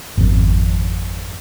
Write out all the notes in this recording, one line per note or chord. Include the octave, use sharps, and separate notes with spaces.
G#1 F2